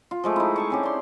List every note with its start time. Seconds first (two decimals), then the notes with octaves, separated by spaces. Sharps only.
0.11 F4
0.24 F3 G#3 A3
0.36 D#4 E4
0.56 G#4 A5 C#6
0.70 C4 C#4 G4
0.83 D5 C6